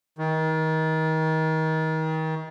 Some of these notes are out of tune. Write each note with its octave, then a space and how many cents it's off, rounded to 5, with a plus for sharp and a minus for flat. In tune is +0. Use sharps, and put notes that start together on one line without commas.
D#3 +30